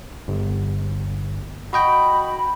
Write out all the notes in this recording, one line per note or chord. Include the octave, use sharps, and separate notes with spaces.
G1
F#4 D#5 G5 B5